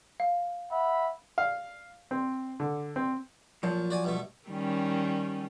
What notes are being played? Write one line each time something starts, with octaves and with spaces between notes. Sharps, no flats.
F5
E5 F#5 B5
F5
C4
D3
C4
A#2 F3 F#3
F#4 D5 G#5
G2 B2 A3
D#3 G3 C#4